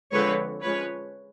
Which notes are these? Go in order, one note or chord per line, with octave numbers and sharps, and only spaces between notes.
D3 F3 G#3 C4 B4 C#5
F3 G#3 C#4 B4 C#5